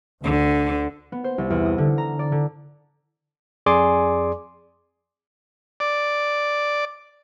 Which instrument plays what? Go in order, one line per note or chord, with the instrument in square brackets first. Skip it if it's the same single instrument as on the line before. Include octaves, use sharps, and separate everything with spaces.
[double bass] D2 [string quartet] D3
[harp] B3
C5
C2
E2
D#6
D3
A#5
D5
D3
[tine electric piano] F2 G#4 D5 G#5 C6 D6
[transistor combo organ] D5